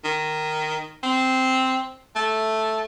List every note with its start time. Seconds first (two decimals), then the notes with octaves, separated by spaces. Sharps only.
0.04 D#3
1.03 C4
2.16 A3